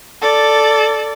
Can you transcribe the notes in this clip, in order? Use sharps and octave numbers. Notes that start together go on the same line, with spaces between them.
A4 D5